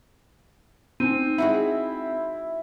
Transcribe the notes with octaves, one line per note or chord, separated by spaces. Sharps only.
C4 D#4 D#7
G#3 E4 F#4 F#5